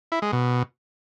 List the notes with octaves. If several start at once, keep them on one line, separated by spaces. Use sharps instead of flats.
E4
G#3
B2